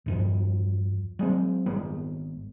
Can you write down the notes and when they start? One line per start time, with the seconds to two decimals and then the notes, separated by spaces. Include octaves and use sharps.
0.06 E2 G2 F3
1.19 F#3 G#3 C4
1.66 G#1 G#3 B3